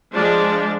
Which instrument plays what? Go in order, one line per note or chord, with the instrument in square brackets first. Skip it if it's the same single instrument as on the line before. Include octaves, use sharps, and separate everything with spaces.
[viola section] F3 G#3 D4